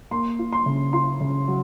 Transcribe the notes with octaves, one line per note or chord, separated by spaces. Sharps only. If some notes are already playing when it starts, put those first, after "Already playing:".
A#3 C6
F4
C6
C#3
F4 C6
C#3
F#3